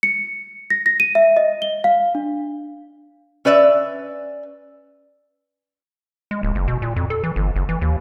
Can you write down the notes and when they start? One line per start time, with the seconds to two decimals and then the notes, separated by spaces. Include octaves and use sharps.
0.03 C#7
0.70 A#6
0.86 A#6
1.00 D#7
1.15 E5
1.37 D#5
1.62 G7
1.84 F5
2.15 D4
3.45 C#4 B4 D5 E5
6.31 G#3
6.43 D1
6.55 F#1
6.68 B2
6.82 A#2
6.96 F2
7.10 A4
7.24 E3
7.36 G1
7.56 F#1
7.69 E3
7.81 D#2